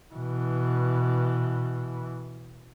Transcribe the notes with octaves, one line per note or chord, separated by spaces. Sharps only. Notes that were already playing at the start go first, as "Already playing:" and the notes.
B2 E3